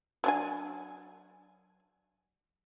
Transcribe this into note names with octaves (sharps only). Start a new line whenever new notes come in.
F#3 D4 G#5